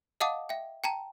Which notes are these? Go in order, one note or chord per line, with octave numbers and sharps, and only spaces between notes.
D#5 F5 F#5 A5 D6 D#6
E5 G5
G5 A5 A#5